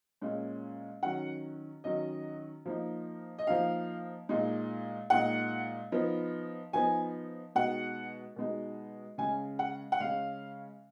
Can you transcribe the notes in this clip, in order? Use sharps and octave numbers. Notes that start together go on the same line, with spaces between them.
A#2 G#3 C#4
D#3 F#3 C#4 F#5
D#3 F#3 C#4 D#5
F3 A#3 D#4
D#5
F3 A#3 D#4 F5
A#2 G#3 D#4
A#2 G#3 D#4 F#5
F3 B3 D#4
F3 B3 D#4 G#5
B2 G#3 D#4 F#5
B2 G#3 D#4
C#3 G#3 C#4 G#5
F#5
F#5
C#3 G#3 C#4 F5